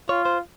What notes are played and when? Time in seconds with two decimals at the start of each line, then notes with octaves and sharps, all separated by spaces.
0.09 F4 C#5
0.25 C5